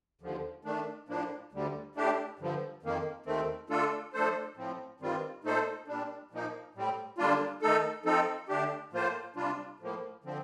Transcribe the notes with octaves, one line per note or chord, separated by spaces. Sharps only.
D#2 D3 F3
D#3 A3 D4
A2 F3 A#3 D4
D2 D3 G3
A2 A3 D4 G4
G2 D3 F3
F2 D#3 A#3
D#2 D#3 A3 C4
D3 A3 D4 F4 A4
F3 A3 D4 A4 C5
A2 F3 C4
G2 D#3 G3 C4 F4
A#2 A3 D#4 A4 C5
A#2 G3 D4
A#2 F3 A#3 D#4
A2 G3 C4
D3 G3 A#3 D4 F4
D#3 A3 D#4 A4
F3 C4 D#4 A4
D3 A3 D4 G4
A2 F3 A#3 F4 C5
C3 G3 D4 F4
A2 F3 A#3
D3 F3 C4